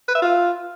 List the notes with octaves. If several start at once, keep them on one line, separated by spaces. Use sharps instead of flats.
B4
E5
F4